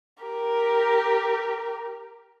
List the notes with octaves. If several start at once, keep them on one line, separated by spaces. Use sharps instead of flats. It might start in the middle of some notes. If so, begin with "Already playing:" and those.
G4 A#4